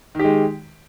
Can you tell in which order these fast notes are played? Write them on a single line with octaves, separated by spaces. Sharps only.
D#3 G4 G#3